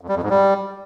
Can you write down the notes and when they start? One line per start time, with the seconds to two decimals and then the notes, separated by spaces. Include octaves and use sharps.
0.01 F2
0.09 G3
0.16 F2
0.23 G#2
0.30 G3